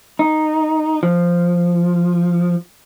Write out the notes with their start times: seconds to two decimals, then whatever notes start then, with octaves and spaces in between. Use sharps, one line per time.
0.19 D#4
1.03 F3